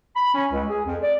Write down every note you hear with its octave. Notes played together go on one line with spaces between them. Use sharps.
B5
C#4
C#2
G#4
F2
D5